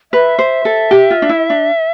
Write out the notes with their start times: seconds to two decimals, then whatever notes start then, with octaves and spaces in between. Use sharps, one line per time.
0.12 B4 E5
0.39 C5
0.65 A4
0.91 G4
1.10 F4
1.22 D4
1.29 E4
1.50 D4